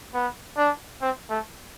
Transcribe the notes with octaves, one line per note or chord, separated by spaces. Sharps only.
B3
D4
C4
A3